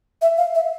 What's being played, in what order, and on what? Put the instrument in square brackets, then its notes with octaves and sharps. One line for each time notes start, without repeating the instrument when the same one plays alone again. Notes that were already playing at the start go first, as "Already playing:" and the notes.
[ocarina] E5
F5
E5